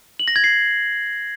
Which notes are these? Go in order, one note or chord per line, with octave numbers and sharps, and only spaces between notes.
F#7
A#6
G#6
C7